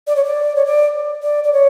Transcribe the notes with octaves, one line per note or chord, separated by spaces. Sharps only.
D5
C#5
D5
C#5
D5
D5
D5
C#5